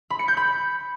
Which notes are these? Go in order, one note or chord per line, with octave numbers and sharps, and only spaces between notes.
B5
C#7
G6
B5